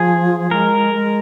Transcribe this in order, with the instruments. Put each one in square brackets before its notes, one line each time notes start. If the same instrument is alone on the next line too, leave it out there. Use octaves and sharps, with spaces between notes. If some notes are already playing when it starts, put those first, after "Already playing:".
Already playing: [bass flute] F3 [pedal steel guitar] G#4
[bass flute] G#3 [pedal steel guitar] A#4
[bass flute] G#3